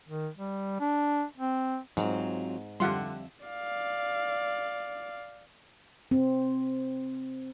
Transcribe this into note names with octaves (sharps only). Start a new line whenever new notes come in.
D#3
G3
D4
C4
G#2 F#3 C4 F4
F2 D3 G3 F4 G4 E5 F#5 C6
D5 F5
C4